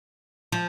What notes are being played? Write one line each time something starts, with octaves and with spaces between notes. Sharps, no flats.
F3